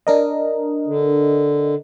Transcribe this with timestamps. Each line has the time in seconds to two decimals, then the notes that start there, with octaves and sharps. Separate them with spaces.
0.07 D4 A#4 D#5
0.87 D3